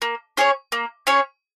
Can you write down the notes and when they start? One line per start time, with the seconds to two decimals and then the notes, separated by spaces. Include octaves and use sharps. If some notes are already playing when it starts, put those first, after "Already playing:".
0.02 A#3
0.37 C#4 G#4 C#5
0.72 A#3
1.07 C#4 G#4 C#5